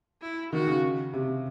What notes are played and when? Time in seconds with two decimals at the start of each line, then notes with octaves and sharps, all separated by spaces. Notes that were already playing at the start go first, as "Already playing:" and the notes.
0.22 E4
0.53 D#3 F#4
0.67 C#3
1.13 C3